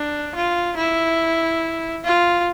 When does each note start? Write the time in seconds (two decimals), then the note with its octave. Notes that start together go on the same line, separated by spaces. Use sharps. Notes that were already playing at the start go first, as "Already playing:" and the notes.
Already playing: D4
0.35 F4
0.77 E4
2.05 F4